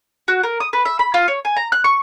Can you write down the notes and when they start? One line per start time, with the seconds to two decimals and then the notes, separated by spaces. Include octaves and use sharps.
0.28 F#4
0.43 A#4
0.60 D#6
0.73 B4
0.85 E5
0.99 B5
1.14 F4
1.28 C#5
1.45 G#5
1.56 A#5
1.72 F#6
1.84 C#6